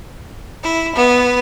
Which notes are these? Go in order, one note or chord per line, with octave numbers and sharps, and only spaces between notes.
E4
B3